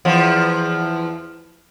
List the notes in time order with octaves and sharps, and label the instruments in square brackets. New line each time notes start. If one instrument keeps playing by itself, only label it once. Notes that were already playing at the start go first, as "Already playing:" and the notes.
[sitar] E2 F3